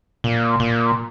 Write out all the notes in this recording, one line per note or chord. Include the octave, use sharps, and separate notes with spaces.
A#2
A#2